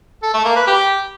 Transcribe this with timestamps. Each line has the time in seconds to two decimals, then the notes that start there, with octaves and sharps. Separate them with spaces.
0.23 A4
0.34 A3
0.45 A#3
0.56 B4
0.67 G4